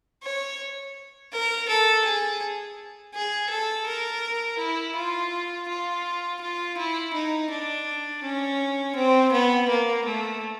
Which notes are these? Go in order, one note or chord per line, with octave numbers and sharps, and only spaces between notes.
C#5
A#4
A4
G#4
G#4
A4
A#4
E4
F4
F4
F4
E4
D#4
D4
C#4
C4
B3
A#3
A3